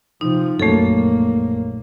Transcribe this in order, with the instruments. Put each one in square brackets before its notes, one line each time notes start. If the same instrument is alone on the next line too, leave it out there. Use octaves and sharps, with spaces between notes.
[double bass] C3 F3 [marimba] D#4
[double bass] A#1 A#3 [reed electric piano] F#2 C#5 [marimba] A3 A4